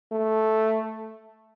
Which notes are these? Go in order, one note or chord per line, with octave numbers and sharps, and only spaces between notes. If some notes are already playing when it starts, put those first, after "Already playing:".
A3